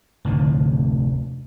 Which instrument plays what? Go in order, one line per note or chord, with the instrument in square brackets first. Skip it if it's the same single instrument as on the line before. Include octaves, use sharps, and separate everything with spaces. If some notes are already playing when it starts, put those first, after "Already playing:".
[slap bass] F1 D2 A2 D3